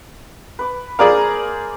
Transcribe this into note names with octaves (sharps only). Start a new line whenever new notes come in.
B4 D6
A#3 G#4 A#4 C5 D5 F5